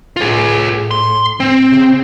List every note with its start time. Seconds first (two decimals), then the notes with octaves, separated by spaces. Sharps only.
0.17 A2 F4 G#4
0.91 C6
1.40 C4
1.70 C#3